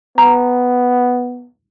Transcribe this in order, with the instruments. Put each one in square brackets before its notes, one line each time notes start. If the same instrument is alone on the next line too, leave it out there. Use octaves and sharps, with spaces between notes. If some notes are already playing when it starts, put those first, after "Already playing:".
[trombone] B3 [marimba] A#5